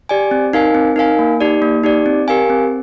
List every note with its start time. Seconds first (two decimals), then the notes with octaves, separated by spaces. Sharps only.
0.09 G4 D5 G#5
0.31 C4
0.53 D#4 A#4 F5 G#5
0.75 C4
0.96 D#4 A#4 F5 G#5
1.19 A#3
1.41 D#4 G4 D5
1.62 A#3
1.83 D#4 G4 D5
2.06 C4
2.28 G4 A#4 F5 G#5
2.50 C4